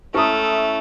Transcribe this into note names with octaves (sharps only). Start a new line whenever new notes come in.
A3 C#4 E4 A4 A#5 D#6